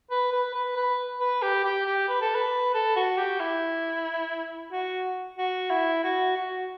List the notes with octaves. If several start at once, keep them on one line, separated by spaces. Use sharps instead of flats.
B4
B4
B4
B4
B4
G4
G4
G4
B4
A4
B4
A4
F#4
G4
E4
F#4
F#4
E4
F#4
F#4